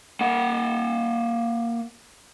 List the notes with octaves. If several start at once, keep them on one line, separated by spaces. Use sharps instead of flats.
A#3 F#5